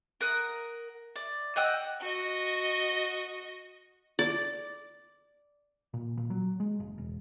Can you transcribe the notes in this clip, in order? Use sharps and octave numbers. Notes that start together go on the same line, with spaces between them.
A#4 F#5 D#6
D5
D#5 F#5 G5 E6
F#4 D#5
D5
A#2
A#2
F#3
G#3
F#1
E1